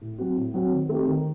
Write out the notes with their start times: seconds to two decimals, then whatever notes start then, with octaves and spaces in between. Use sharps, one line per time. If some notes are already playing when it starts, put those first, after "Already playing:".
0.01 A2
0.19 F#3 C4 F#4
0.36 A2
0.54 F#3 C4 F#4
0.72 D#3
0.89 A3 C4 D#4 G4
1.07 D#3